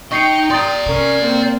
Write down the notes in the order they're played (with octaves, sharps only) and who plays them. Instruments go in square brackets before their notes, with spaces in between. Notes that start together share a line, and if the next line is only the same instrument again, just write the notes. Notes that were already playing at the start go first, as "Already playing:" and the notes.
[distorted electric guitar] D#4 D#5 [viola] G5 [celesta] C#6 C7 C#7
[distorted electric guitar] D5 A#5 [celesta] C6 D#6 A6
[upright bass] C3 [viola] C#4 A#4
[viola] A#3 C4